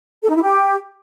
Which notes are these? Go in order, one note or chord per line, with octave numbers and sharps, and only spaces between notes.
A4
D#4
E4
G4